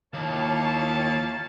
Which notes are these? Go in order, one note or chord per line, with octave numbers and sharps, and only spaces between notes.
D#2 A#3 E4 F4 C#5 F5 A5